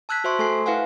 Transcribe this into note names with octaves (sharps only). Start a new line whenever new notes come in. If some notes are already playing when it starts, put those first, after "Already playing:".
A5 E6 F#6 G#6 B6
F#4 C5 E5 C6 C#6
A3 A4 G#5 C6 C7
E4 B4 F5 F#5 G#5